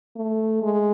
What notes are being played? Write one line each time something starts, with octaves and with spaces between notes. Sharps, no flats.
A3
G#3